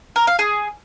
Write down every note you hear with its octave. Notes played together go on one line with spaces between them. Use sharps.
A#4
F5
G#4